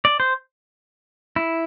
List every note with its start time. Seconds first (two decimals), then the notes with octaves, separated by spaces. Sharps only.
0.05 D5
0.20 C5
1.36 E4